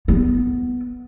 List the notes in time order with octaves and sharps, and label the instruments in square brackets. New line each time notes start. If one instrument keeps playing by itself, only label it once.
[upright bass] B3